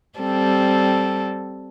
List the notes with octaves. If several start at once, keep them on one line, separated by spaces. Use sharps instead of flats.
G3 C4 A4